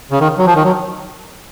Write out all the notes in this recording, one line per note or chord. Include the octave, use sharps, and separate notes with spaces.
C#3
D#3
F#3
F3
D#3
F#3